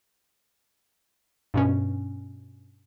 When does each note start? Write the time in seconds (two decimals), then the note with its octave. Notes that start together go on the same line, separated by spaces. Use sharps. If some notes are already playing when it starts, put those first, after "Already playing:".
1.54 G2 B2 C#4